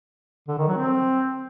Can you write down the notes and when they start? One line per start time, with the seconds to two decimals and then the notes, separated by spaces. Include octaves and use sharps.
0.48 D3
0.58 D#3
0.67 F#3
0.77 C4